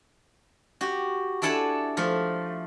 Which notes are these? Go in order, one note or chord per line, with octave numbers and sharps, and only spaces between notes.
F#4 G4
D4 E4 A4 F#5 G#5 A5
F3 A3